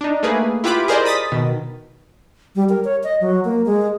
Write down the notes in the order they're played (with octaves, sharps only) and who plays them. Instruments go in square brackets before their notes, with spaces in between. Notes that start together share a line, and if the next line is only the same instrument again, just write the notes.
[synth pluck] D4 D#4
A3 A#3 G#4 B4
E4 F4 G4 B4 B5 D6
G#4 A#4 C5 D5 D#5
B5 D#6 A6 B6
B2 D#3
[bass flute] G3
A#4
C#5
D#5
F#3
A#3
G#3